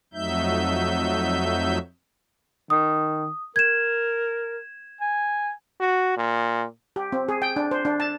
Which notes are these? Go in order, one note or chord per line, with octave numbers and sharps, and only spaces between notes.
F2 F#3 A3 D#4 E5 G6
D#3 D#6
A#4 G#6 E7
G#5
F#4
A#2
G4
C4
G#4
G5
D4
C5
D4
A5